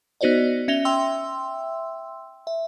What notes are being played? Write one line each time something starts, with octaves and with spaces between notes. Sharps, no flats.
B3 D#4 F#4 C5 D5 D#5
C#4 E5 A#6 F7 G7
E5 G5 C6 E6
E5